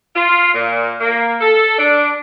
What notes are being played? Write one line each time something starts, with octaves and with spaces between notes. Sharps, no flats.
F4
A#2
A#3
A4
D4